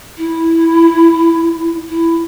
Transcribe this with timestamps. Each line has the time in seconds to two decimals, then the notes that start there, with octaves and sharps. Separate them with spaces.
0.17 E4
1.89 E4